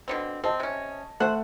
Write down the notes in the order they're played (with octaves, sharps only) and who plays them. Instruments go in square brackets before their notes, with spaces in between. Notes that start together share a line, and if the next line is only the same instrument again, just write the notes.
[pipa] B2 D3 C4
[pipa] C4 [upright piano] D#5 A5
[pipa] C3 C#4
[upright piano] A3 [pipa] C5 F#5